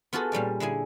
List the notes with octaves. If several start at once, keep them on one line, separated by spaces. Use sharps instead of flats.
B3 F4 F#4 G#4 A4
A#2 G3 C#4 D5
D3 E4 G#4 G#5